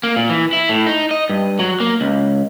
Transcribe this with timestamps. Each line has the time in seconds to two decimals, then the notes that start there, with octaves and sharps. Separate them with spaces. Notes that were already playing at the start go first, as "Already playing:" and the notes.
0.03 A#3
0.17 A#2
0.30 E3
0.53 E4
0.69 A2
0.86 D#4
1.11 D#5
1.29 G2
1.59 F#3
1.80 A#3
2.01 C#2